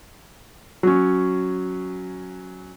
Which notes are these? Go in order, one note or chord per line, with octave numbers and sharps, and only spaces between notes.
F#3 C#4